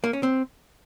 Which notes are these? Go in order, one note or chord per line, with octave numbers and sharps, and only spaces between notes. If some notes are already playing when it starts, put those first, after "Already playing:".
A#3
C#4
C4